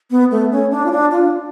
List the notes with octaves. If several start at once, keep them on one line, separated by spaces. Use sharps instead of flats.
B3
A3
C#4
D4
F4
D4
F4